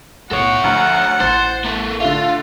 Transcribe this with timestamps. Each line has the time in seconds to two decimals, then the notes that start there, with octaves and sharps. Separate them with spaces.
0.31 B1 A2 A4 C#5 F#5
0.64 D2 F3 A#5
1.20 A1 C5 A6
1.64 A#3 A4
2.00 D3 A3 F4